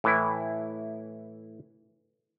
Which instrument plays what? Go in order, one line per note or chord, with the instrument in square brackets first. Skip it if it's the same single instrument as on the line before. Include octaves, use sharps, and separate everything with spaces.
[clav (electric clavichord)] A2 E3 E4